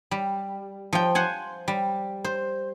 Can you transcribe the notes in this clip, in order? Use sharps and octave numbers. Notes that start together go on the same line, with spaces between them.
G3
F3 G5
C5 F#5 G#5
G3
C5